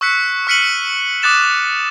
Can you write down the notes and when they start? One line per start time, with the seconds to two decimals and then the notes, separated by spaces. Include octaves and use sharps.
0.01 C#6 E6 F#6 B6 C#7
0.47 C#6 F6 B6 C#7 D#7 F#7
1.22 D6 D#6 F#6 A6 E7 F#7